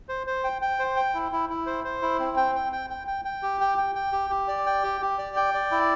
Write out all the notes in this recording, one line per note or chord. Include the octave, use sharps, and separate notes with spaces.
C5
C5
G5
G5
C5
G5
E4
E4
E4
C5
C5
E4
C4
G5
G5
G5
G5
G5
G5
G4
G5
G5
G5
G4
G4
D5
G5
G4
G4
D5
G5
D5
E4